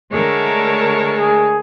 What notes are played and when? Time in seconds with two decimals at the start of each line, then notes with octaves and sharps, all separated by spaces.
0.12 D3 G#3 A3 A#4 C#5 A5
1.18 G#4